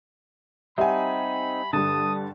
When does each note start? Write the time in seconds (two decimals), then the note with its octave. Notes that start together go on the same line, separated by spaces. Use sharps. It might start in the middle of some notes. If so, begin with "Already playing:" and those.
0.78 G3 C4 D#4 E5 F#5 G#5 B5
1.73 G2 D3 A4 A5 D#6